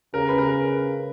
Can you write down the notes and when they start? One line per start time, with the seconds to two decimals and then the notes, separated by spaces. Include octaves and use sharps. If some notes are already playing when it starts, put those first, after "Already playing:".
0.14 C#3 A#4
0.29 B4
0.38 A#4